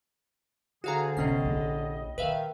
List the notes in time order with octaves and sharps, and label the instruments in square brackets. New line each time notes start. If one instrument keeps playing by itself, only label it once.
[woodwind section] D2 G#4 [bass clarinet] D3 [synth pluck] F#4 F5 A#5
[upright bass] A1 B3 [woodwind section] A2 G3 D#5 [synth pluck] C3 C#4 C7
[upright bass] A#1
[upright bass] A#2 [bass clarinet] D#3 [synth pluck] B4 E5 F5